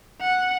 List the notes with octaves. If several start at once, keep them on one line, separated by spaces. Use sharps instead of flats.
F#5